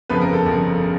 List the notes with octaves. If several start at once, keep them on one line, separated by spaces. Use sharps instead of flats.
G1 F2 C#3 F3 B3 B4
A#4
A4
G1 F2 C#3 F3
C#3